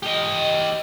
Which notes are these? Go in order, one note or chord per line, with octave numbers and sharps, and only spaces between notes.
G4 D#5